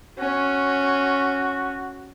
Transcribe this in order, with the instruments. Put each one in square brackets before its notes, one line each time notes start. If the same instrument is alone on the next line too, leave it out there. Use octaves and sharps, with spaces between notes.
[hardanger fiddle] C#4 [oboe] F#4